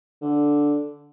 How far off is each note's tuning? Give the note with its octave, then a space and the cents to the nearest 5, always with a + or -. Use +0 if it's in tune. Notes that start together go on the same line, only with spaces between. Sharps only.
D3 -5